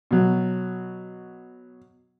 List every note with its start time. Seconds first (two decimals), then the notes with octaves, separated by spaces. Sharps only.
0.11 B2 F#3